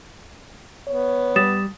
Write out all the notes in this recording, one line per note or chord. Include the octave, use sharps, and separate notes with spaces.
B3 C#5
G3 D#6 A6 E7